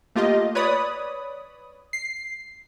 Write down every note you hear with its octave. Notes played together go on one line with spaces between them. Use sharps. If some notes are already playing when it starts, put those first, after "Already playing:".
A3 A#3 F4 G4 D#5
B4 C#5 D5 B5 D#6
C7